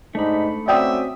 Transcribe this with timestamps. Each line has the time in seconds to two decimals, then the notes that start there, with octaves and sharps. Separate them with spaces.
0.15 G#2 A3 D4 D#4 B5
0.68 C4 C#4 F#4 D5 E5 G5 D#6